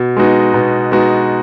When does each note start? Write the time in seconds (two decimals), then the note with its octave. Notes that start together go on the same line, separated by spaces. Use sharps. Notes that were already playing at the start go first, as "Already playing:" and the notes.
Already playing: B2
0.17 G#3 B3 D#4 F#4
0.54 B2
0.92 G#3 B3 D#4 F#4